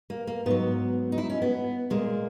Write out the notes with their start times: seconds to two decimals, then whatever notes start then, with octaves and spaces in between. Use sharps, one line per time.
0.10 A#3
0.27 A#3
0.46 G#2 F#3 B3
1.12 D#4
1.18 E4
1.30 C#4
1.42 B3
1.90 A#2 G#3 A#3